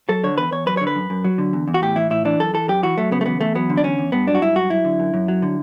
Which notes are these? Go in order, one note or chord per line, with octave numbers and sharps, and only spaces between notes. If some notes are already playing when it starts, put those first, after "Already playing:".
F#3 A4
D3 C#5
E2 B4
E2 C#5
F#3 B4
D3 C#5
B4
F#2
F#2
F#3
D3
E2
E2
F#4
A2 G4
E3 E4
A2 E4
E3 D4
F#2 A4
E3 A4
F#2 G4
E3 F#4
F#3 A3
C#3 B3
A3
E2 B3
E2 A3
F#3 B3
D3
D4
E2 C#4
E2
G2 B3
F#3 D4
F#4
G2 E4
F#3 F#4
F#3 E4
D3
F#2
F#2
F#3
D3